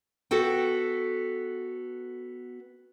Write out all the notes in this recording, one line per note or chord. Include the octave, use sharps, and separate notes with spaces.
B3 F#4 A4 G5